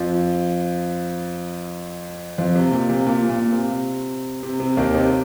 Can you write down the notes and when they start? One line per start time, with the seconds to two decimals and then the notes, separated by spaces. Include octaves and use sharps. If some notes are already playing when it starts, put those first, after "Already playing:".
Already playing: F2 F3
2.38 F2 F3
2.56 C3
2.72 A#2
2.89 C3
3.07 A#2
3.29 A#2
3.52 C3
4.43 C3
4.60 C3
4.77 D#2 D#3
4.94 C3